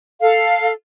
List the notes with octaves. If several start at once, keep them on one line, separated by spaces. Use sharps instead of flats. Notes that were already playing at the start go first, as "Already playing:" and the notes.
A4 F5